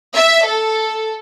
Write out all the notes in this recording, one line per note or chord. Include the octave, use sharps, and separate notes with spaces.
E5
A4